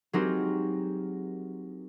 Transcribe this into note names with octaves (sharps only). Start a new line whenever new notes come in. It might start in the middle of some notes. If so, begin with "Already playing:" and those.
F#3 G#3 C4 D#4 G4 A#4